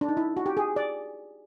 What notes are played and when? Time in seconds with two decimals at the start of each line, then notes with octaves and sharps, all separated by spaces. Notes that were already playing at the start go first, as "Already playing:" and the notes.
0.01 D4
0.09 D#4
0.17 E4
0.37 F#4
0.46 G4
0.57 G#4
0.76 D5